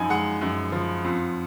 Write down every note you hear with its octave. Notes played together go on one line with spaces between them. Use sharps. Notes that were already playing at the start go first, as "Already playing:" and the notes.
Already playing: F#2 F3 D#4 G#5 B5
G#3 F#5
F#2
F3
F2